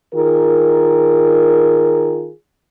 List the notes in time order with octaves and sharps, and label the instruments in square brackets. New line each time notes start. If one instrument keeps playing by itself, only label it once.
[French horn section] D#3 F4 G#4 A#4